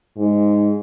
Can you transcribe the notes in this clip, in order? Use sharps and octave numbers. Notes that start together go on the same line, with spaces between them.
G#2